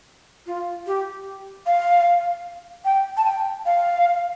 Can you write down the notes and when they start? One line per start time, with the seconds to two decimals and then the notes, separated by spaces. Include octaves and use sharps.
0.47 F4
0.87 G4
1.67 F5
2.85 G5
3.17 A5
3.25 G5
3.66 F5